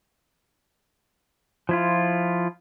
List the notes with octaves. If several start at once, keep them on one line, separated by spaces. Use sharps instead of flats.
F3 E4 F4